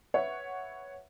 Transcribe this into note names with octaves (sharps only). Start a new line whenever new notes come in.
B4 C#5 E5 F#5